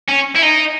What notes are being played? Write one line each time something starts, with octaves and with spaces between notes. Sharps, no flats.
C#4
E4
D#4